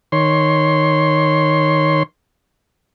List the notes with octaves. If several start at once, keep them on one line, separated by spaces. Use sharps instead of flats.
D#3 C#5 C6